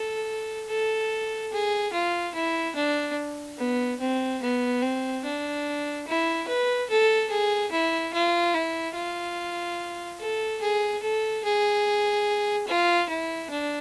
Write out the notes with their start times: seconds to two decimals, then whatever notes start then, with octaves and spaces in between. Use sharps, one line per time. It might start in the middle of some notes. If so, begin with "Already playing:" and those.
Already playing: A4
0.69 A4
1.53 G#4
1.93 F4
2.35 E4
2.76 D4
3.59 B3
4.00 C4
4.42 B3
4.82 C4
5.24 D4
6.07 E4
6.49 B4
6.90 A4
7.31 G#4
7.72 E4
8.14 F4
8.54 E4
8.96 F4
10.20 A4
10.62 G#4
11.03 A4
11.44 G#4
12.68 F4
13.09 E4
13.51 D4